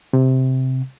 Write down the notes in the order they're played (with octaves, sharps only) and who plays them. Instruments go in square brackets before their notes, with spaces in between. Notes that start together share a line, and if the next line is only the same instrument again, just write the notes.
[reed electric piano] C3